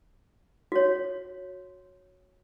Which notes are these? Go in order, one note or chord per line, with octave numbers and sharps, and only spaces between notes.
F#4 C#5